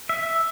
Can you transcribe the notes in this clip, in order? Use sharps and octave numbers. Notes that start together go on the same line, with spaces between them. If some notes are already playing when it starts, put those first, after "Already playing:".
E5